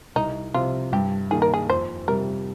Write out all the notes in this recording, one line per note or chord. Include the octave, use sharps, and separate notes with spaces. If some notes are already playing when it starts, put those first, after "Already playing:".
C2 D#4
C3 F3 F4
G2 G4
D#3 A#3 D#4 G#4
A#4
G#4
F2 C5
C3 G3 A#4